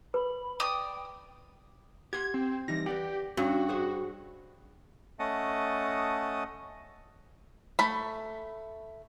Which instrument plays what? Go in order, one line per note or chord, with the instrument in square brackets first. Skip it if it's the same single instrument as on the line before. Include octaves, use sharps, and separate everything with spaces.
[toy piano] B4 [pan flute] B5
[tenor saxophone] D5 [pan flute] G5 [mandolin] D#6
[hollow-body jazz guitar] G4 F#5 C6 [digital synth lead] G#6
[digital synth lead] C4
[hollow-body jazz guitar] E3 G3 D#4 [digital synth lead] A#6
[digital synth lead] G4 [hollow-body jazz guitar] B4 D5 F#5
[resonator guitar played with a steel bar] G2 [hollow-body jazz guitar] C#4 [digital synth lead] F#4
[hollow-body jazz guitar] G#4 C5 C#5
[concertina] A3 C#4 D#5 F#5 A5 D#6
[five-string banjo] A3 B5